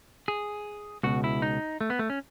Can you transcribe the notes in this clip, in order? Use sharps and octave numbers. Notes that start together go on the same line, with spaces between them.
G#4
C#2 B2 F#4
E4
D#4
A3
B3
A3
C#4